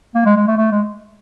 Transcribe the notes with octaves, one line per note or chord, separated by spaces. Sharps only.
A#3
G#3
G#3
A3
A3
G#3